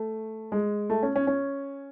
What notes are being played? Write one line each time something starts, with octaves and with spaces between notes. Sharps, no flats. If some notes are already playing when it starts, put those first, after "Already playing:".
Already playing: A3
G#3
A3
C#4
C#4
C#4